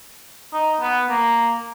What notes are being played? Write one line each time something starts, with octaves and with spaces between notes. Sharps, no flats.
D#4
B3
A#3